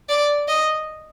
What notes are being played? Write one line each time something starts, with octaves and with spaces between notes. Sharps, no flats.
D5
D#5